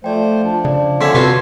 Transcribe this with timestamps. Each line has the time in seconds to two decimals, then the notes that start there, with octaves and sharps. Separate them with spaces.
0.04 F3 A3 C5 D5 G5
0.44 F3 D4
0.65 C#3 D5
1.01 D3 C#4 E5 C6 G#6
1.15 C3 B3 F4 F#4 B4 C#5 A5